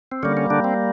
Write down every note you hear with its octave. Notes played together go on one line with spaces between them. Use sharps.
C4
D3 G3 A#3 C#4
C#4
D3 D4
C4